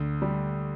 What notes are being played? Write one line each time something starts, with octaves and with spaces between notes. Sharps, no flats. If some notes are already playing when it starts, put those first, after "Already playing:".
Already playing: D2
G3